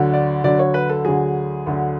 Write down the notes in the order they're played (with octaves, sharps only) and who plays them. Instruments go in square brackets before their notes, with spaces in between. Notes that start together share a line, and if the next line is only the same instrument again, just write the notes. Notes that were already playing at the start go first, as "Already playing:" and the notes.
Already playing: [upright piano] D2 D3 F#3
D5
D2 D3 F#3 D5
C#5
B4
A4
D2 D3 F#3 G#4
D2 D3 F#3